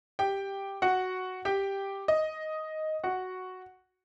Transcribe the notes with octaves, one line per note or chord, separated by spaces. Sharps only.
G4 G5
F#4 F#5
G4 G5
D#5
F#4 F#5